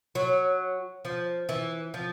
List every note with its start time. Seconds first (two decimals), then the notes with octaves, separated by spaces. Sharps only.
0.15 F#3
1.05 F3
1.49 E3
1.94 F3